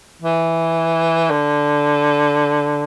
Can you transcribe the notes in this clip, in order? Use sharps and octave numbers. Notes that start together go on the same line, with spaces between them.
E3
D3